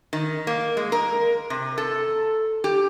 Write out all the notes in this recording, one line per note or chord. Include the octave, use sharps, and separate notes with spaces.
D#3
A#3
G#3
A#4
C3
A4
G4